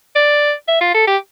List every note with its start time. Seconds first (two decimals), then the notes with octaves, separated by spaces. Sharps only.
0.16 D5
0.68 E5
0.81 F4
0.94 A4
1.07 G4